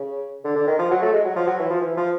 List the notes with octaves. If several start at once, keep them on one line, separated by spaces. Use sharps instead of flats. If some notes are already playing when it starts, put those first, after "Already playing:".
Already playing: C#3
D3
D3
D#3
F3
F#3
A3
G#3
F#3
F3
F#3
E3
F3
E3
F3